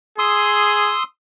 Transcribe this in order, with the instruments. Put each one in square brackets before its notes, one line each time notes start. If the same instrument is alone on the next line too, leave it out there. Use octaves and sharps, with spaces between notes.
[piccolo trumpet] G#4 [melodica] C6 D#6 E6